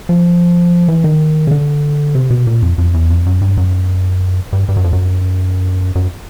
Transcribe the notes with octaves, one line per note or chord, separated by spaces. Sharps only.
F3
E3
D#3
C#3
D3
C3
B2
A#2
F2
F2
E2
F2
F#2
G2
F#2
G2
G2
F#2
F2
F#2
F#2